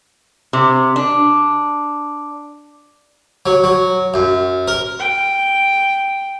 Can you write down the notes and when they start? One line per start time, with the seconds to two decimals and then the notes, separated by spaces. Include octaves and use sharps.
0.53 C3
0.96 D4
3.46 F#3
3.64 F#3
4.14 F#2
4.68 A#4
4.99 G5